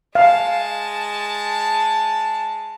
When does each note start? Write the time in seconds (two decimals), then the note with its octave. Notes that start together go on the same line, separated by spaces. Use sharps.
0.15 G#3 F5 A5